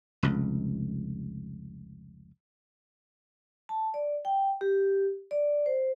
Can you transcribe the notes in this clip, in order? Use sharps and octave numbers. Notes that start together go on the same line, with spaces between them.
F1 C#2
A5
D5
G5
G4
D5
C5